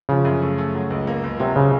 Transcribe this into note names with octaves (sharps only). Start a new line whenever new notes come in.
C#3 F3
F#2
A3
A3
F#3
C#2
A#3
C#2
C3 F#3
C#3